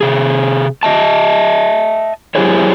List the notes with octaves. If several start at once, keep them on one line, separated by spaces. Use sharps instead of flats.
C3 G#4
D#5 E5 A5
F#3 E4 G4 G#4 C5 C#5